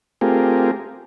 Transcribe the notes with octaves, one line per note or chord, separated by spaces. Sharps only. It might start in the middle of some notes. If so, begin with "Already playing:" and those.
A3 C4 F4 G4 G#4 A#4